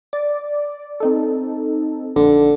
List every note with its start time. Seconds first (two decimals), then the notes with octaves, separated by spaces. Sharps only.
0.13 D5
1.00 C4 D#4 A4
2.16 A#1 D3